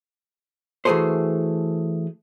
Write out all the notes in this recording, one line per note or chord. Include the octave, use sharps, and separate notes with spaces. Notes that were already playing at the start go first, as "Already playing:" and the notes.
E3 A3 F#4 G#4 A4 C5